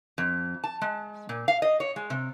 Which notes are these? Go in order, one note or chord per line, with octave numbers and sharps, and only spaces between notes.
F2
A5
G#3
A#2
F5
D#5
C#5
G#3
C3